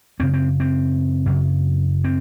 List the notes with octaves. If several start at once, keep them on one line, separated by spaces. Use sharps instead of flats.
F#2 C#3 C4
C4
C4
F#2 C#3
C4